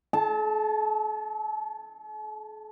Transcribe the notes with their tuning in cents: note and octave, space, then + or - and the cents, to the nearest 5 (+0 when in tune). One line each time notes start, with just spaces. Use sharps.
A4 -45 A5 +0